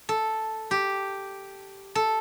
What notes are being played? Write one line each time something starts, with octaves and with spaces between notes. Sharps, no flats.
A4
G4
A4